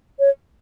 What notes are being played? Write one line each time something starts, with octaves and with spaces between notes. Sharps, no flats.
C#5